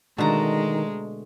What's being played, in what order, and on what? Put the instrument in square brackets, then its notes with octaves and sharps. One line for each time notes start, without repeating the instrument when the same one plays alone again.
[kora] B2 D3 A3 [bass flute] D#3 [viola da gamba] G#3 [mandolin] A5 A#5